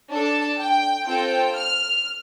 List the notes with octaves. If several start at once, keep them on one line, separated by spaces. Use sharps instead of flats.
D4 A4 A5
G5
C4 F4 A4 G5
F6